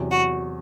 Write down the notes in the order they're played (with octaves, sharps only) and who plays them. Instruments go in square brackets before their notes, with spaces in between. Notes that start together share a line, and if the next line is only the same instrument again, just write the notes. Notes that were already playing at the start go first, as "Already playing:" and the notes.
Already playing: [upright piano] E2 C3 F#3
[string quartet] F#4